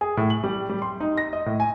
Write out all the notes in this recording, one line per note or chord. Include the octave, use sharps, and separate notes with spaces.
G#4
A2
F#7
G3
G3
C6
D#4
A#6
D#5
A2
G#5